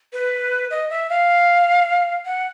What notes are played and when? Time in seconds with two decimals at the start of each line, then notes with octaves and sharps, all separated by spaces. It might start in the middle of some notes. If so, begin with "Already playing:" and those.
0.13 B4
0.71 D#5
0.90 E5
1.09 F5
2.25 F#5